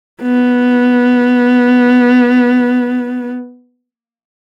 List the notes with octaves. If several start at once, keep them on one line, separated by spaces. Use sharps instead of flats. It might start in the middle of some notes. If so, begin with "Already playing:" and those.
B3